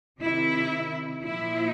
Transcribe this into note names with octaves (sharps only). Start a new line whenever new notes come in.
C3 D#3 E4
A#2 F3 E4